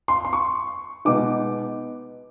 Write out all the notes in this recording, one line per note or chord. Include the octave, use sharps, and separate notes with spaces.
C6
C6
C#6
B2 G#3 B3 D#4 D6